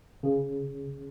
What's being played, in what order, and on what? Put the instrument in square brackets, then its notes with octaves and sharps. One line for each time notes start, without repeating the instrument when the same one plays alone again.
[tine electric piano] C#3